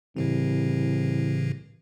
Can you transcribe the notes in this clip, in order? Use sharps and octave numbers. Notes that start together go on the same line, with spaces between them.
C2 A2 C#3 E3